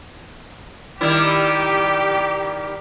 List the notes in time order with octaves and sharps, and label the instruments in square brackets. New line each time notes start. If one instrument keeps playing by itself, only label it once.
[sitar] D#3 G3 E4 [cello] G4